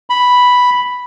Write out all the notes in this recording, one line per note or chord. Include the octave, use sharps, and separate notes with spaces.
B5